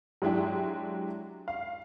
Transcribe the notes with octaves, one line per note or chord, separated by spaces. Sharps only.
F#3 G#3 D4 E4 G4
F5